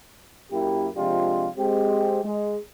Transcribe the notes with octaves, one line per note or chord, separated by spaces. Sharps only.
F#2 A#3 E4 G4
C3 F3 G#3 D4 F4 G4
G#3 C4 G4
G#3